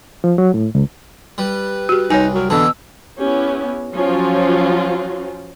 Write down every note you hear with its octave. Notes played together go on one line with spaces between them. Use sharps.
F3
F#3
A2
C#2
G3 B4
F#4 G4
C2 D#4 C#5 G#5
F#3 A#4
E2 B2 D3 E3 A5 E6
B3 C#4 E4 G4
F3 F#3 C#4 F4